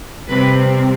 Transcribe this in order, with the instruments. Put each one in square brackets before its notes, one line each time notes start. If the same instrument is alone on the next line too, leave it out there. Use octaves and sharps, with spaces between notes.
[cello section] C3 G3 C4 B4